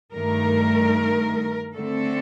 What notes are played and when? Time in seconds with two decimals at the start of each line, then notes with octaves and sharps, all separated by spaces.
0.14 G2 D#3 A3 A#4
1.73 D3 A3 C4 A4